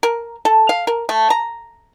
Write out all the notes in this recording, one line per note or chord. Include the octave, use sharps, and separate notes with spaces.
A#4
A4
F5
A#4
A3
A#5